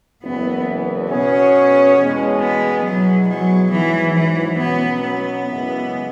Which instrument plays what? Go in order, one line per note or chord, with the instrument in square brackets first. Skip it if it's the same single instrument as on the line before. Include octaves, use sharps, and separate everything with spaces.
[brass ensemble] F#1 E2 E3 [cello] B3
[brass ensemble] B2 B3 G#4 C#5 [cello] C#4
[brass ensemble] E2 B2 G#3
[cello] B3
[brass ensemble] B2 G#3 B3 E4 G#4 [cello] F#3
[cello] F#3
[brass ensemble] G#2 F#3 B3 E4 [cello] E3
[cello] E3
[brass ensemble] B2 F#3 C#4 [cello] B3
[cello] B3
[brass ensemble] F#2 C#3 E3 G#3